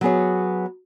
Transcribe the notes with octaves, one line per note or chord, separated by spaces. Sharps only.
F#3 B3 G#4 C#5